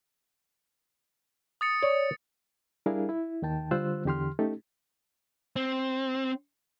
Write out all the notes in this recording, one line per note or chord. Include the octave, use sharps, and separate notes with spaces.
D#6 A6 C#7
C#5 D5
G3 D4 E4 G#4 A#4 F5
E4
D#2 D#3 G5 A5
D3 G3 F4 C5 E6 F#6
E2 D3 G4 C6 F6
A3 C#4 D#4 G4 A4
C4